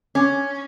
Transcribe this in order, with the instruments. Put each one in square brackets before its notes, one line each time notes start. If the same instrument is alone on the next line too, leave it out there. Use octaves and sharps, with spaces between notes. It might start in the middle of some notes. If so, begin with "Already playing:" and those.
[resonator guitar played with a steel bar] C#4